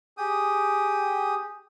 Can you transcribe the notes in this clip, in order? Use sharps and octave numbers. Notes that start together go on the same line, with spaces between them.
G4 G#4 G5 D#6